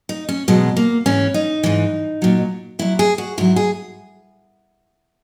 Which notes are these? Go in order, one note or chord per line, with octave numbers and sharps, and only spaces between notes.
D#4
C#4
E2 B2 F#3 G#3
A#3
G#2 E3 C#4
D#4
G#2 E3
A#2 F#3
A#2 F#3 E4
G#4
F#4
G#2 F#3 E4
G#4